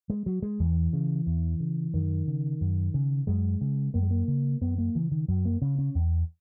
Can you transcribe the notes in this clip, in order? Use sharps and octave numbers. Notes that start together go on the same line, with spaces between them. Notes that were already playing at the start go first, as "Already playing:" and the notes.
G#3
F#3
G#3
E2 E3
C#3
E2
C#3
F#2 D#3
C#3
F#2
C#3
F#2 G#3
C#3
F#2 A#3
G#3
A#3
C#3
F#2 B3
A#3
C#3 E3
D#3
F#2 F#3
A#3
C#3 C#4
C#4
E2